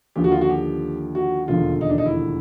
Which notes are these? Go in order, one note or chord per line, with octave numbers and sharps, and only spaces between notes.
D#2 D3 F3 G4
F#4
F4
F#4
G4
F#4
E1 D#2 D3 F3 F4
D#4
D4
D#4
E4